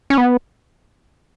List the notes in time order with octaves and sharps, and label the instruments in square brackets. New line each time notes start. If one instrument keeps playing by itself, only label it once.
[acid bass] C#4
B3